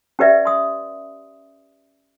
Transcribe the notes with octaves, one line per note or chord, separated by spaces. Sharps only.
C#4 G4 B4 D5 E5
C6 D#6